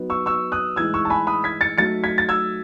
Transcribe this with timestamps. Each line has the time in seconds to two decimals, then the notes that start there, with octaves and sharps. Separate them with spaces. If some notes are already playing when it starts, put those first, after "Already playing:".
Already playing: F#3 B3 D#4
0.10 C#6 E6
0.26 C#6 E6
0.52 D#6 F#6
0.76 A2 E3 G#3 D#4 E6 G#6
0.94 C#6 E6
1.05 A5
1.10 G#5 B5
1.27 B5 D#6
1.44 G#6 B6
1.61 A6 C#7
1.78 F#3 A3 D#4 A6 C#7
2.04 G#6 B6
2.18 A6
2.29 E6 G#6